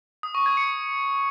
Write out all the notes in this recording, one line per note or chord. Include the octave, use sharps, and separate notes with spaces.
D#6
C#6
G#6
C#7